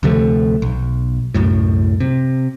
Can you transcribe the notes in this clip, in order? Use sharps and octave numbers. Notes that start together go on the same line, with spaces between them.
D2 C3 F3 A3
B1
C2 F#2 A2
C3